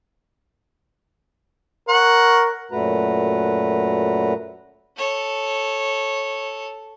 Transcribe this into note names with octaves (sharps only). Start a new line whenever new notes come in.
A#4 C#5 F#5
F#2 A#2 A3 F#4 B4 A#5
A4 C#5